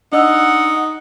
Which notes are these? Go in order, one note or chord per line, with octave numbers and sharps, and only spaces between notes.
D4 D#4 D#5 F#5 E6